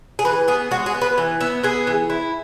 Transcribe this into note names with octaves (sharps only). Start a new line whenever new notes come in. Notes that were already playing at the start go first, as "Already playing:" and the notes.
G#4
E3 B4
B3 G#4
G#3 F#4
G#4
B3
B4
E3
B3 E5
B3 G#4
E3
E4